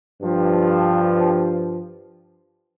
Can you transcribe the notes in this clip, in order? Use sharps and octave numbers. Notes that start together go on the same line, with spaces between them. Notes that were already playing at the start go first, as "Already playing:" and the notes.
G2 F3